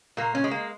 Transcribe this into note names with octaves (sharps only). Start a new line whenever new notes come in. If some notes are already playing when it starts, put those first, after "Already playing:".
A#2 A#3
C#4
G#3
A#3